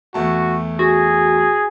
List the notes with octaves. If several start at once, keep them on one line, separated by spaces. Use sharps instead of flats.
E2 A3 F#4 A5
F#4 G#4